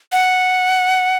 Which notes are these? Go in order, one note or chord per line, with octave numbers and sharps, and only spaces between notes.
F#5